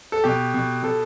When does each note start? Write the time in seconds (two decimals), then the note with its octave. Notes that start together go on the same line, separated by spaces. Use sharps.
0.12 A4
0.24 B2 G4
0.54 B2
0.83 B2 A4